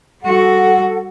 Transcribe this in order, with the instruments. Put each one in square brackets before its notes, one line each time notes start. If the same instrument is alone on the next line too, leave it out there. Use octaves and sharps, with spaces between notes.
[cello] G3 F#4 [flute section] A4 F#5